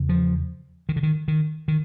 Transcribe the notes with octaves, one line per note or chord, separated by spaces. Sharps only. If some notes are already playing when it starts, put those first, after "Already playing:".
Already playing: E2 C#3
F3
D#3
D3
D#3
D#3
D#3